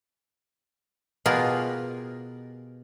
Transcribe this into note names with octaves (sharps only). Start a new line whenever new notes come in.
B2 F4 G4 G#4 A#4 B4